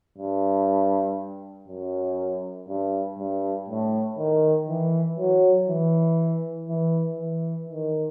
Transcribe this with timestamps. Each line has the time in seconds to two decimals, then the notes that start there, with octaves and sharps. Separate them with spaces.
0.18 G2
1.68 F#2
2.69 G2
3.18 G2
3.69 A2
4.19 D#3
4.69 E3
5.19 F#3
5.69 E3
6.69 E3
7.19 E3
7.69 D#3